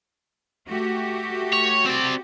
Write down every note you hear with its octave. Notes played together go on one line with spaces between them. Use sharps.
A3 F#4 G4
C#5
C4 D5